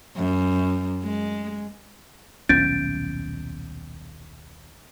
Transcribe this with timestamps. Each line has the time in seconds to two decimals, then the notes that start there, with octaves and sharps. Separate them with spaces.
0.16 F#2
1.03 G#3
2.49 D#1 B1 C#4 G6 A6 D7